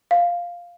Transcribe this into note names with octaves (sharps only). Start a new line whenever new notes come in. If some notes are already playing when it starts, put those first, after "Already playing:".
F5